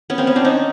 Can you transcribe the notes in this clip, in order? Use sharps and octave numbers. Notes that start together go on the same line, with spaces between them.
B3 C#4
A#3 C4
B3 C#4
C4 D4
C#4 D#4